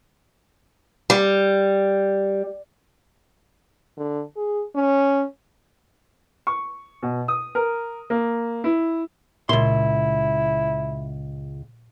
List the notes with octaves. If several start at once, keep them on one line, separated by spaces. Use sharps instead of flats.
G3
D3
G#4
C#4
C#6
B2
D#6
A#4
A#3
E4
C#2 A#2 E4 C6